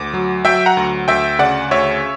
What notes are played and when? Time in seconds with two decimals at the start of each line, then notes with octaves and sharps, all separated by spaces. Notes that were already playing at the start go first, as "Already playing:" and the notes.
Already playing: D2 D6
0.14 F#3
0.45 F#3 E5 G5
0.66 F#5 A#5
0.77 D2
1.08 D2 E5 G5
1.39 C#3 D5 F#5
1.71 D2 C#5 E5